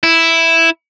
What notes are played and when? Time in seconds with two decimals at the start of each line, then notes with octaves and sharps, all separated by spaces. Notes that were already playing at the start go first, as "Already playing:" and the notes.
0.03 E4